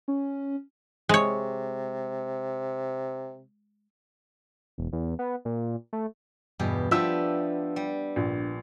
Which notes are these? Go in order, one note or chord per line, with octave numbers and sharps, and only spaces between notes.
C#4
C3 G#3 C#5
E1
E2
B3
A#2
A3
E2 G2 B2 G4
F3 B3 D4 G4 E5 E6
G3
A#1